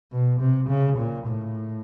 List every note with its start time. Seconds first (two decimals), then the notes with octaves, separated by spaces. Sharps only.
0.13 B2
0.40 C3
0.69 C#3
0.98 A#2
1.27 A2